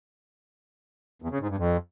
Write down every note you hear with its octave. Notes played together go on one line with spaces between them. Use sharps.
E2
C#3
G#2
G2
F2